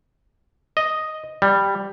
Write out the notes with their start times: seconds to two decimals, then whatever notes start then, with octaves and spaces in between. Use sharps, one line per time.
0.77 D#5
1.42 G3